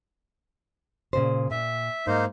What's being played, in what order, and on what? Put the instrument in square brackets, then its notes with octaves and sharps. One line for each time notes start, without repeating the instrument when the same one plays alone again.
[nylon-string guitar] A#2 C#3 C5
[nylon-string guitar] A#2 [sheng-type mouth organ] E5
[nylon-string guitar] G#2 [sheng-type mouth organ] A#3 D#4 C5